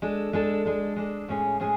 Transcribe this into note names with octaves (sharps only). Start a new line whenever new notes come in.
G#3 D4 A4
G#3 D4 A4
G#3 D4 A4
G#3 D4 A4
A2 G#3 C#4 G#4
A2 G#3 C#4 G#4